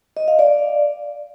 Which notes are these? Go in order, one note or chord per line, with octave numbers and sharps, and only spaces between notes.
D#5
F5
D5